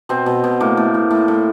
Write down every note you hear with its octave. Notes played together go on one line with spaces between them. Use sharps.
B2 C4
B2
B2
A2 A#3
A2
A2
A2
A2